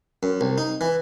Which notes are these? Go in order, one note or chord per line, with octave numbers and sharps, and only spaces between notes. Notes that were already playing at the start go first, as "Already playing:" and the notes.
F#2
C2
D#4
E3